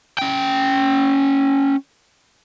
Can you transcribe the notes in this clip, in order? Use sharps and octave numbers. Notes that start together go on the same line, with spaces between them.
C#4 G5